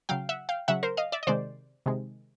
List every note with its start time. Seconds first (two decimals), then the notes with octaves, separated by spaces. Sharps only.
0.09 C#3 F#3 F5 G5
0.29 E5 F#5
0.49 F5 G5
0.68 C#3 F#3 E5 F#5
0.83 A#4 C5
0.97 D#5 F5
1.12 D5 E5
1.23 D#5
1.27 C3 D#3 G#3 C5 D5
1.86 C3 D#3 G#3